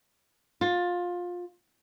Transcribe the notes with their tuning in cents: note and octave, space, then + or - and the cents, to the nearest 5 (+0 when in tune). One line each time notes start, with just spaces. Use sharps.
F4 +20